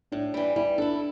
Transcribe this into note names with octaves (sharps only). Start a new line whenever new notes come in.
A2 D4
E3 G3
G3 E4
D4 E4 A4